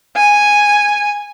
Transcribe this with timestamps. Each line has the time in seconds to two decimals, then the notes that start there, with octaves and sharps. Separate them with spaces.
0.17 G#5